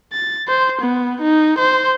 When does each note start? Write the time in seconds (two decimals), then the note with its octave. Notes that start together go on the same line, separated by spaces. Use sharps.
0.13 A6
0.48 C5
0.82 B3
1.21 D#4
1.59 C5